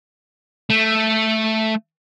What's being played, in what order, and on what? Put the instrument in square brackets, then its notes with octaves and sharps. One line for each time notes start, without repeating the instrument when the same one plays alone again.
[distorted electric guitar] A3